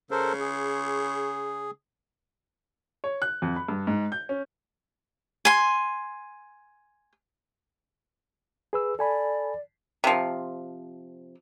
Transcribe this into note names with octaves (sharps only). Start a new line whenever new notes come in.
C#3 A4 A#4 C5
G#4
C#5
F#6
F2
B5
G2
G#2
G6
C#4
G#5 C6
G#4 B4 E6
A4 D5 G#5 B5
C3 F3